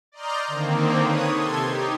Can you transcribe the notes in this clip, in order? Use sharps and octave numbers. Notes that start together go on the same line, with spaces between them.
D5 D#5 A#5 C6 F6 G6
D3 D#3 A#3 C4
B4 C#5 D#6
C3 A4 C6 G#6
D#4 G4